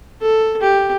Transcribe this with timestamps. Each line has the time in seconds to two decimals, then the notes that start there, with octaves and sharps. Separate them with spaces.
0.21 A4
0.62 G4